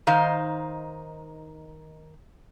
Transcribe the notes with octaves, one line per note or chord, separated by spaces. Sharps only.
D#3 D#4 C5 F5